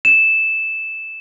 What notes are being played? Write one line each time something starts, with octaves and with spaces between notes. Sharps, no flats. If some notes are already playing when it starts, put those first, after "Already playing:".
E7